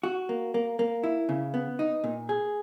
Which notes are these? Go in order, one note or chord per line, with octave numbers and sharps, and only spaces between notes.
F#4
A#3
A#3
A#3
E4
C#3
B3
D#4
A#2
G#4